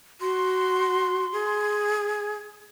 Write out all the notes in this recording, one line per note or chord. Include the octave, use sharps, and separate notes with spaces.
F#4 C6
G#4